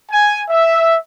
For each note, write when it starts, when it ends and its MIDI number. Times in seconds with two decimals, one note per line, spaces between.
0.12 0.42 80
0.50 0.96 76